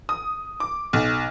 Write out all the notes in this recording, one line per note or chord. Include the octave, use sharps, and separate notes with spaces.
D#6
D6
B1